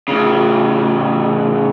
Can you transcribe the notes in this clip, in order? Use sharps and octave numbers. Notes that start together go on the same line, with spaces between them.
A2 C#3